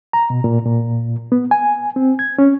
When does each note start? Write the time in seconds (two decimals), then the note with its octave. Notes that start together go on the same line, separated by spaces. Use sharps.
0.13 A#5
0.30 B2
0.44 A#2
0.66 A#2
1.32 B3
1.51 G#5
1.96 C4
2.19 G#6
2.39 C#4